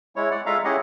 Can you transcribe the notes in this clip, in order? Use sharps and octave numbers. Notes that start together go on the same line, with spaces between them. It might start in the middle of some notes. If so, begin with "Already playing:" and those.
G#3 E4 C#5
D5 F#5
G#3 F4 A4 E5 F5 A#5
C#4 E4 G4 G#4 D#5 F#5